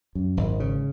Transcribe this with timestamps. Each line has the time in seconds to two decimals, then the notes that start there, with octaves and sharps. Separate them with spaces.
0.15 F#2
0.37 G#1
0.60 C#3